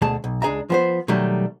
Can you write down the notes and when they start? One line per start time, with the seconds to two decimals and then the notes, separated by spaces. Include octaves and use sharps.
0.02 D2 B2 A3 G#4 A5
0.24 B1
0.42 C#2 D4 G#4 E5 A#5
0.70 F3 B3 C5
1.08 B2 D#3 F#3 G3 A3